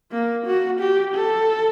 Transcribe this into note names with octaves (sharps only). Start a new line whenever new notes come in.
A#3
F#4
G4
A4